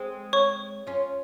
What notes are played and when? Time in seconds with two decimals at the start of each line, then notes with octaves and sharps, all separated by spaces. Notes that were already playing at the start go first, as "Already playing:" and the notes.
Already playing: G#3 C4
0.33 C#5 C#6
0.87 C#4 F4